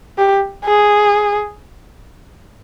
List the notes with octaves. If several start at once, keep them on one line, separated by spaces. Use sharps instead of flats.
G4
G#4